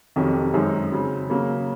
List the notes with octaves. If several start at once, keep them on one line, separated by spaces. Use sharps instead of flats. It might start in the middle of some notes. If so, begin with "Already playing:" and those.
F2 C3 D#3 F#3 C#4
F#2 D#3 G#3 C4 D#4
C#3 F#3 C4
C#3 F#3 A#3